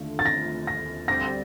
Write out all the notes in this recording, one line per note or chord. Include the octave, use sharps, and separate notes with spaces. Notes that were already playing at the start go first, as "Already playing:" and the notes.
Already playing: D#2 D3 A3 D4 F4
A6
A#6
A#6
D2 D3 G3 C4 A#6